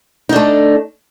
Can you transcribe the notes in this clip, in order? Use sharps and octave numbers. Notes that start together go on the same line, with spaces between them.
A3 D4 D#4